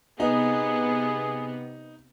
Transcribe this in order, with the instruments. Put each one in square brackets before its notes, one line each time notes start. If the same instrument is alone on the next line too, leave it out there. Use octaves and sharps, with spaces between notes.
[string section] C3 B3 [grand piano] D#4 [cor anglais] G#4